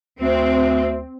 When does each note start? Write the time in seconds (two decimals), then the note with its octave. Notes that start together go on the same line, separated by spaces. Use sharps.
0.20 D2 C4